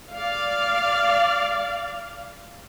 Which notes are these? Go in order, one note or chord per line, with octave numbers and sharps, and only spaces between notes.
D5 F5